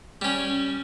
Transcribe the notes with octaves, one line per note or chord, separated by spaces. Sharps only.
G3 C#4